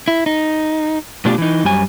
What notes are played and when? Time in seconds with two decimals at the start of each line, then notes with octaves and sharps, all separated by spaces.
0.08 E4
0.26 D#4
1.25 B2 A3 D4 F4 G4 F5
1.38 E3 D#4
1.64 F#2 G3 G#5